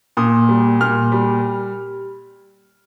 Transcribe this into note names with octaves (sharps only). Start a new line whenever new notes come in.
A#2 D#6
G3
A#2 F6
G3